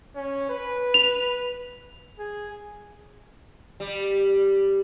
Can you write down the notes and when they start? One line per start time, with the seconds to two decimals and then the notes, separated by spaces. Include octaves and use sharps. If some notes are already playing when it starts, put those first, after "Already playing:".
0.15 C#4
0.50 B4
0.94 F7
2.19 G#4
3.80 G3